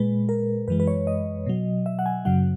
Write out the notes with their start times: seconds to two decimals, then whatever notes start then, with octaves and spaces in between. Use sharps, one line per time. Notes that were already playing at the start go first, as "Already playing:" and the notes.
Already playing: A#2 G#3 B4
0.29 A#4
0.68 F#2 E3 G#3 B4
0.80 B4
0.87 C#5
1.07 D#5
1.46 B2 F#3
1.86 E5
1.99 F#5
2.06 G#5
2.25 F#2 C#3 F#3 F#5